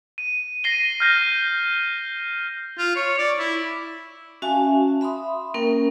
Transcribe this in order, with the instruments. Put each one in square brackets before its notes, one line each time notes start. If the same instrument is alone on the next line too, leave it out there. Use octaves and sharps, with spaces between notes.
[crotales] D#7
A#6 C7 D#7 G7
F6 G6 A#6
[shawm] F4
C#5
D5
E4
[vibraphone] C#4 F#4 E5 F5 G#5 A5
E5 B5 C6 D#6
A#3 C#4 A#4 G5